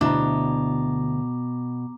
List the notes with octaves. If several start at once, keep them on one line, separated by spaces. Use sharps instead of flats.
D2 B2 D4 E4 A#5 D6